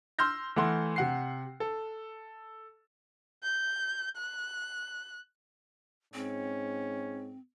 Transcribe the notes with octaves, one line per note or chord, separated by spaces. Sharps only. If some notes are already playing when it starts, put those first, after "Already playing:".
C6 E6 F6 G6 A#6
E3 A3 F#5 C6
C3 F#5 C7
A4
G6
F#6
G#2 C4 C#4